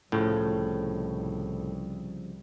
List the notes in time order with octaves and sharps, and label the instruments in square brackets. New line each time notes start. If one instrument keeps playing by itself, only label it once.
[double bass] C2 [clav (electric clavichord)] A2 [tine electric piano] C#3 F3